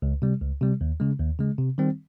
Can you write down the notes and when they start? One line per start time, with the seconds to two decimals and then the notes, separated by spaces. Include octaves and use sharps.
0.02 C#2
0.22 C3 G3
0.41 C#2
0.61 C3 G3
0.81 D#2
1.00 C#3 G#3
1.19 D#2
1.39 C#3 G#3
1.59 C3
1.78 D#3 G3 C4